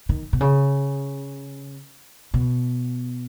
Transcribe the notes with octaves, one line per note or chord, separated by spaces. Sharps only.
D#3
B2
C#3
B2